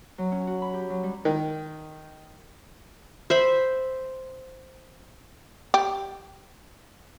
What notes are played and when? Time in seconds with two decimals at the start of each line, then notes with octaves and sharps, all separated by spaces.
0.18 F#3
0.32 C#4
0.47 F#4
0.62 B5
0.74 G4
0.90 F#3
1.03 G3
1.25 D#3
3.30 C5 E5 B5
5.74 G4